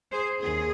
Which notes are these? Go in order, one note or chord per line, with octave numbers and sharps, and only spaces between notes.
G#4 C5
D#2 D#3 G#4